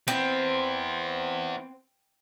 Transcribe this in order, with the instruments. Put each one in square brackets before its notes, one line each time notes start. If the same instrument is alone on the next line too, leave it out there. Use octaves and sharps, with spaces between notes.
[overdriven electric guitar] B3 E4 [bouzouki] C4